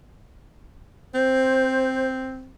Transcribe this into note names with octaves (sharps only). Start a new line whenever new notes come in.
C4 C5